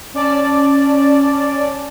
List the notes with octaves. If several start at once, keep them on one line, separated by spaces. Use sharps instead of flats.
C#4 D5 A5